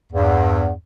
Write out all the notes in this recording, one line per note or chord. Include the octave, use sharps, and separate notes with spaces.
E2 G2